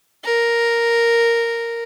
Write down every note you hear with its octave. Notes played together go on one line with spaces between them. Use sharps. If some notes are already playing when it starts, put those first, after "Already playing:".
A#4